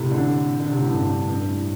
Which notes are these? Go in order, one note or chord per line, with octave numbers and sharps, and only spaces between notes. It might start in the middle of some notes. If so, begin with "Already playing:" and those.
Already playing: A2 C3
D3
D3
C3
A2
G2
G2
A2